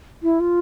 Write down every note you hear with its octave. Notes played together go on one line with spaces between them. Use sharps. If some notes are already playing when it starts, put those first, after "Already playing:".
E4
F4